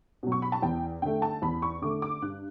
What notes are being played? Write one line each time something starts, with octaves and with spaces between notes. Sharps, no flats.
B2 F#3
C#6
B5
A5
E2 G5
D3 A3 G5
A5
E2 B5
C#6
D3 A3 D6
D6
G2 F#6